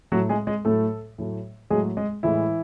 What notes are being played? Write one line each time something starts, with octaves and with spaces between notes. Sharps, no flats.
A2 F#3 A3 F#4
G#3 G#4
G#3 G#4
A2 F#3 A3 A4
A2 F#3 A3
A2 F#3 G#3 A3 G#4
G#3 G#4
A2 E3 G#3 E4